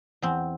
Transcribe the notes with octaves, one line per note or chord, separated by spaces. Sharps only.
E2 C4